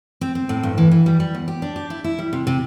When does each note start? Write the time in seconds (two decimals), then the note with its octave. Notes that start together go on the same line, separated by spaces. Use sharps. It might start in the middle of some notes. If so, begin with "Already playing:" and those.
0.21 C4
0.35 C4
0.49 A2
0.63 G2
0.78 E3
0.91 E3
1.06 G3
1.20 G3
1.35 E2
1.48 G4
1.62 D4
1.76 G4
1.90 E4
2.04 E4
2.19 G3
2.33 C3
2.47 C3